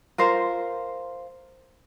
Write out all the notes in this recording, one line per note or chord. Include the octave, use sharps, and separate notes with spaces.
F4 A#4 C5